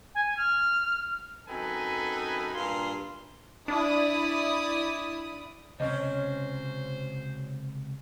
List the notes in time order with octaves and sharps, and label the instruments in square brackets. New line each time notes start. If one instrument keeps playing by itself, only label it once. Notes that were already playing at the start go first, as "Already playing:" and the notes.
[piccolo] G#5
F6
[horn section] F#2 C4 D#4 A4 B4 G#5
G2 A#2 F5 A#5 C6
[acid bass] D4 [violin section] E4 D5 D#6
[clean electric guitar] C#2 C3 [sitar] F#3 C#4 [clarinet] C5 [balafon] D#5